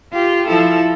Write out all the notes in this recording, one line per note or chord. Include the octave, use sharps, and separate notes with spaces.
F4 G4
F3 E4 A4